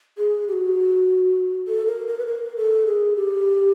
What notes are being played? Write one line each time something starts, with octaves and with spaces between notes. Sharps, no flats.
G#4
G4
F#4
A4
A#4
A#4
B4
A#4
A4
G#4
G4